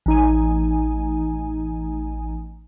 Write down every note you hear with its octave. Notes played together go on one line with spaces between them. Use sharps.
A1 D#4 G#5